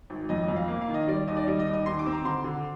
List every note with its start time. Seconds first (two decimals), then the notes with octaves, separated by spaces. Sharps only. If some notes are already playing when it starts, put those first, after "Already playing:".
0.10 G#1
0.29 F2 D#5
0.43 D#5
0.48 F2
0.56 F5
0.68 A#3
0.81 F5
0.88 D#3
0.94 D#5
1.07 G3 D5
1.27 D#2 D#5
1.37 D5
1.47 G3 D#5
1.59 D#5
1.66 D#2
1.73 D#5
1.86 D#2 C6
1.99 D6
2.06 C4
2.12 A#5
2.25 D3 C6
2.44 D3